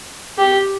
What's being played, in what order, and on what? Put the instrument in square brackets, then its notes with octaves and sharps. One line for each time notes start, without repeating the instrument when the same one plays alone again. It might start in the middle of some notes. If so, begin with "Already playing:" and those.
[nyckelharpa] G4